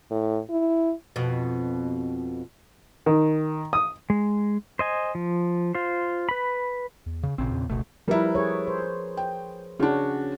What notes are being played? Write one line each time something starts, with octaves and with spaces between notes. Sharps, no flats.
A2
E4
F2 B2
D#3
D#6
G#3
C5 D#5 G#5
F3
F4 C5
B4 B5
E2
C#3
A1 A#2 C#3 C4
E2
F#1 C#2 B2 A3
F3 G3 E4 A#4 B4
G#4 B4 C#5
C5
G5
C#3 C#4 D4 F#4